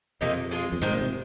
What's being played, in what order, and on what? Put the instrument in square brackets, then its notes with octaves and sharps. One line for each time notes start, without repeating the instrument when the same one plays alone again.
[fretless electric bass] F2 [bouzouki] C3 D#3 A#3 D#4
[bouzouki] G#3 F4 G#4
[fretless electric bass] F2
[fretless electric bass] G#2 [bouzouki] D#3 G#3 C4
[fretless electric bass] A#2
C3